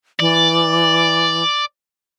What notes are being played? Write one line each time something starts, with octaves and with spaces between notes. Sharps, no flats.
E3 D5